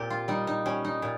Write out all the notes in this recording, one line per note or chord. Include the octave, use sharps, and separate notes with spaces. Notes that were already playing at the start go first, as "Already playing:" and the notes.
Already playing: A#2 C4 G4 A#4
F4
G3 D#4
D#4
G3 C#4
D#4
A#2